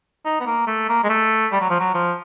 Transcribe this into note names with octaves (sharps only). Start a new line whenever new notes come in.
D#4
B3
A#3
A3
A#3
G#3
A3
G3
F#3
F3
F#3
F3